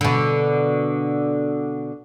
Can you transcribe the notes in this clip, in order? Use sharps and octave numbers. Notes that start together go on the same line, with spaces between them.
B2 D3